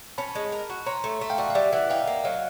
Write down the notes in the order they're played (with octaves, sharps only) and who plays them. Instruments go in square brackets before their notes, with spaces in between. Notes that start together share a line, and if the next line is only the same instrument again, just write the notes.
[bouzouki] C#4 [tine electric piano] A5 B5
[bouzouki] G#3
A#4
F#4
[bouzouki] C#4 [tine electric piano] A#5 C6
[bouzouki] A3
A3
[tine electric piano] F5 G5
[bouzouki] F#4 [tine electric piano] D5 E5
[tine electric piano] F5
[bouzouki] G3 [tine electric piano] D5 E5
[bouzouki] E3 [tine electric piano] E5 F#5
[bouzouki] D#4 [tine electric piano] F5 G5
[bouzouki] A#3
[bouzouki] F#3 [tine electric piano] D#5 F5